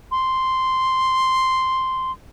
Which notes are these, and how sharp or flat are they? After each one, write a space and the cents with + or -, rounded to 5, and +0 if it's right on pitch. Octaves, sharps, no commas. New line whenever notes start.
C6 -5